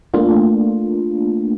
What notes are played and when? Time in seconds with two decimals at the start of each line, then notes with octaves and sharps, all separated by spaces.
0.14 A3 A#3 D4 F4